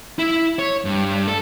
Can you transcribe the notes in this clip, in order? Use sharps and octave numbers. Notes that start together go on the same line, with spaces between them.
E4
C#5
G2
A4